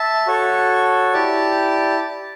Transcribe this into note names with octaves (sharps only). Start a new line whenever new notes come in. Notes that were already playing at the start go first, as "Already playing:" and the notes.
Already playing: E5 A5
F#4 A4 C#5
E4 G4 D5 A5